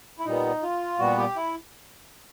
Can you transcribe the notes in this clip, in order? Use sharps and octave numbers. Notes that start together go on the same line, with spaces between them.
E4
A#2 G3 B3 D#4
F4
A#2 G3 B3 F#4
G4
E4